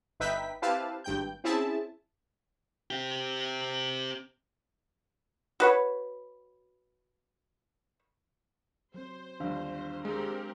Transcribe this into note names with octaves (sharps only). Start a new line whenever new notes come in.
G1 D#4 B4 E5 G5 B6
C4 E4 G4 B4 F5 A5
G#1 G2 G5 G6
C4 C#4 E4 G#4 E5 A5
C4 G4
F#4 B4 C#5
F#3 C4 C5
G1 D#2 D4 F5
G#3 C4 G4 A#4